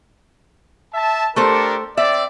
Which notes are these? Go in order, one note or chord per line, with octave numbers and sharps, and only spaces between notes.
E5 A5
A3 D4 G4 A4 A#4 C5
C4 D5 E5